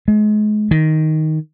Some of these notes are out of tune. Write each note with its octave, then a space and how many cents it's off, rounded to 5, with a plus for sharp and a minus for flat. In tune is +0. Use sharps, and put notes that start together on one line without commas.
G#3 +35
D#3 +5